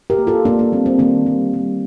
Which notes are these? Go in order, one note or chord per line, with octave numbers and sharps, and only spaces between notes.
G4 A#4
A#3
F4 A4
A#3 D4
A#3
G3 C4
C4
D#3 A#3 D4
G3
G3